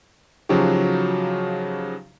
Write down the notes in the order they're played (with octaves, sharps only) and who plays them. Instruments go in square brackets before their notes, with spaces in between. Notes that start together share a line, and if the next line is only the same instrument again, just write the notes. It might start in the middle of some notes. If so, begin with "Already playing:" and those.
[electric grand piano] C#3 F3 F#3 D#4 F#4 G4